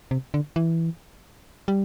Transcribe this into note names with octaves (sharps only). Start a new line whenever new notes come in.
C3
D3
E3
G3